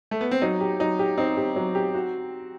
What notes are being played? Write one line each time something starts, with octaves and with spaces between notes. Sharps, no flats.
A3
B3
C4
F#3 D#4
G4
F#3 D#4
G4
C4 D#4
G4
F#3
G4
F#4